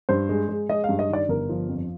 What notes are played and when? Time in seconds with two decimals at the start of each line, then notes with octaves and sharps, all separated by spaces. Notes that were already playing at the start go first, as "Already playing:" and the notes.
0.09 G2 C5
0.29 G#3
0.49 G#3
0.69 G#3 D#5
0.84 F5
0.89 G2
0.99 D#5
1.09 D#3 D5
1.28 G1 A#4
1.49 F3
1.69 F2